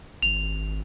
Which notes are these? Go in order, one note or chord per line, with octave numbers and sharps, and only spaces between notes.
G#1 F7